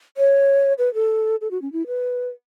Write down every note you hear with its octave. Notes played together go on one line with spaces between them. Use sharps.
C#5
B4
A4
A4
F#4
C#4
E4
B4